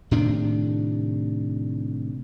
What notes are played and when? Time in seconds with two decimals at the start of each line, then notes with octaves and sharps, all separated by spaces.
0.11 A2 C3 D#3 D4